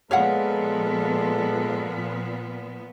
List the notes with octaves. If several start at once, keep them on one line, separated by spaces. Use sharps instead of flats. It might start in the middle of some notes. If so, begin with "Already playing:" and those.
A#2 F3 G#3 B3 A4 C#5 F5 F#5